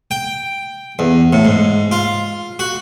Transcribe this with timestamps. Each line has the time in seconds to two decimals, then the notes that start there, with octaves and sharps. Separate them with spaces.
0.11 G5
0.99 E2
1.33 A2
1.45 G#2
1.92 F4
2.59 F#4